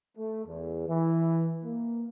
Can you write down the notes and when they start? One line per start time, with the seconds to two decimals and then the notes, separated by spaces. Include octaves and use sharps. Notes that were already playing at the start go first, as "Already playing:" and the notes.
0.17 A3
0.46 E2
0.88 E3
1.64 A#3